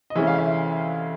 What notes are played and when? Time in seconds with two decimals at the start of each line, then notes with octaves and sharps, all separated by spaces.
0.10 D#5
0.15 D2 C3 E3 G#3 C#4 E5
0.27 F5
0.38 E5